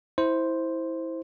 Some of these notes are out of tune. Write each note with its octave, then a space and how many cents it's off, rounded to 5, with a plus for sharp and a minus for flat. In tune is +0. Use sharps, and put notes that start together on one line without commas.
E4 -15 C5 +0